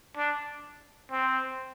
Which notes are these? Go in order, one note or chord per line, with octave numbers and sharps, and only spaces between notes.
D4
C4